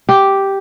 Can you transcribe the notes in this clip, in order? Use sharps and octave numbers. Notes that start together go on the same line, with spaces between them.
G4